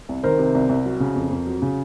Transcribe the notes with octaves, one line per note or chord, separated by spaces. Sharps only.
C2
D#3 A#4 C5
C3
C2
C2
F#3
C#3
F2
F2
F#3
C#3